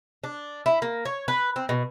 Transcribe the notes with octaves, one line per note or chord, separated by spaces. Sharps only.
D4
E4
A#3
C#5
B4
C4
B2